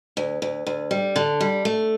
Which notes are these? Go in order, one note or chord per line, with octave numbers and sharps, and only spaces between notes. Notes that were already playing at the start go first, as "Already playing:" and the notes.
D2
D2
D2
G3
D3
G3
A3